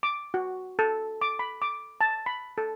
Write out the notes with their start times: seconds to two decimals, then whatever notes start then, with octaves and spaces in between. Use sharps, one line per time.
0.03 D6
0.34 F#4
0.79 A4
1.22 D6
1.39 B5
1.62 D6
2.01 A5
2.26 B5
2.58 A4